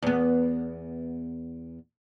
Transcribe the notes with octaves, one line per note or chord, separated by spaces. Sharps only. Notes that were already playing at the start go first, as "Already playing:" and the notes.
E2 B3